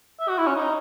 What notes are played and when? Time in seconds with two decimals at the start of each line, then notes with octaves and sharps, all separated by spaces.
0.20 E5
0.29 F#4
0.38 E4
0.47 C#4
0.56 D#4